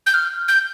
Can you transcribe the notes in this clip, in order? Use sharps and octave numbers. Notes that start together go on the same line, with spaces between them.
G6
F6
G6